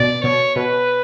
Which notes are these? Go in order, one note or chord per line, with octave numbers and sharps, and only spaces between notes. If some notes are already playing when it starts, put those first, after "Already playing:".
Already playing: B2 D5
B2 C#5
B2 B4